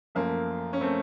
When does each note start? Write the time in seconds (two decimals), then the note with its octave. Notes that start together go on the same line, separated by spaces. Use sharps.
0.15 F#2 F3 A3 A#3
0.73 C#4
0.81 A3 C4